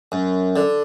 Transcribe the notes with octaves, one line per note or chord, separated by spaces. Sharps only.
F#2
D3